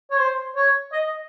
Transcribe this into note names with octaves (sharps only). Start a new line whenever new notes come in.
C#5
C5
C#5
D#5